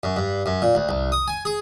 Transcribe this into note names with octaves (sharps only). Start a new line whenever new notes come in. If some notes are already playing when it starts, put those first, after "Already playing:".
F#2
G2
F#2
A#2
D2
C2
D#6
G#5
G#4